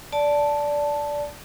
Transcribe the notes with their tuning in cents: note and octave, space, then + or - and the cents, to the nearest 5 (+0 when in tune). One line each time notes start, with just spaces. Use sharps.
D5 -10 A5 +0